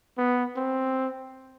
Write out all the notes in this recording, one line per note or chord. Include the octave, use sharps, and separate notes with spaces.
B3
C4